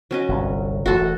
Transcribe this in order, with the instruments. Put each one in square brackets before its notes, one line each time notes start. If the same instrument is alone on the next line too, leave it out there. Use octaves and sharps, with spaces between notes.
[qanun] F#3 C#4 D#5
[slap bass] G1 C2
[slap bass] E1 A3 [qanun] F#4 A4